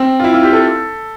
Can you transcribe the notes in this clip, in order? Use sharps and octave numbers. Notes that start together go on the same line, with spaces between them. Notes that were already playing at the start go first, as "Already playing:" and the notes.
Already playing: C4
F4
E4
F4
G4
A4